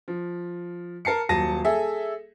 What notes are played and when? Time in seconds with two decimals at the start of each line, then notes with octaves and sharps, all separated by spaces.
0.08 F3
1.05 A#4 A5 C7 C#7
1.29 D#1 F#3 A5 A#6 D#7
1.65 G#4 A4 E5